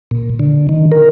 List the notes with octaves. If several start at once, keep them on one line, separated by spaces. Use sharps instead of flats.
A#2
D3
D#3
A#4